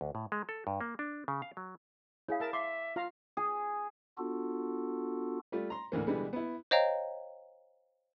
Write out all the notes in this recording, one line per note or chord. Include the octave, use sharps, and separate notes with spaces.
D2
A2
G#3
A4
G2
A#3
D4
C#3
F5
F#3
E4 G#4 C#5 F5
A#4 E5 A5
E5 C6 D6
F4 F5 A#5
G#4
B3 D4 F4 F#4 A4
G3 A3 F4
A#5 C6
D2 A2 E3 A#3
B2 D3 E3 G3 G#3 B3
B3 E4
C5 C#5 D#5 F5 G5 A#5